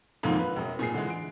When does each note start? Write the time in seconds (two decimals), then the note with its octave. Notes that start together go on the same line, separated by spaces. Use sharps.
0.23 F2 G#2 D3 F3 A#3 D#4
0.39 B4
0.56 E1 F#2
0.79 A#2 G#4 C7
0.94 D3 E3 G#3
1.10 D7